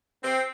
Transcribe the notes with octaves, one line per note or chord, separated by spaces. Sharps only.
C4